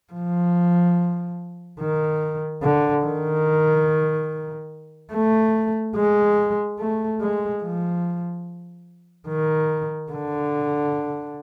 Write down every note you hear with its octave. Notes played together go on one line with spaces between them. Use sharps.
F3
D#3
D3
D#3
A3
G#3
A3
G#3
F3
D#3
D3